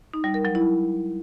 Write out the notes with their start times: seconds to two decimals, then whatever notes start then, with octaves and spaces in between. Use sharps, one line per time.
0.14 D#4
0.24 G3
0.34 A#4
0.45 F#3
0.55 E4